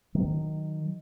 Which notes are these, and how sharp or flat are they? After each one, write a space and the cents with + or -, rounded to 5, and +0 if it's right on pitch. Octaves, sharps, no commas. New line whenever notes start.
D#3 +0 F#3 +0